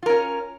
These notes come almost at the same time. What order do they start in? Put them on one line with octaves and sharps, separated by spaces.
F4 A#4 C#4